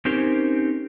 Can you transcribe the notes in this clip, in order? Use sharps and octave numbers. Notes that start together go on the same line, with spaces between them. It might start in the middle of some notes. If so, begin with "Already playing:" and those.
C4 C#4 D#4 G4 A#4 C5